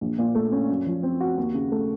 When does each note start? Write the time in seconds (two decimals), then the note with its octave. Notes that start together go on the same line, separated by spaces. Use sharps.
0.01 A#1
0.18 A#2
0.35 A3
0.52 C#4
0.69 F#2
0.86 F3
1.03 C4
1.20 F#4
1.37 D#2
1.54 C#3
1.72 A3